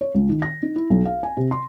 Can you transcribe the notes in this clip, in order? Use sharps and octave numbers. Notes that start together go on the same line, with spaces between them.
C#5
C#2
D#3
A#6
D#4
E4
B1
F5
G#5
C3
C6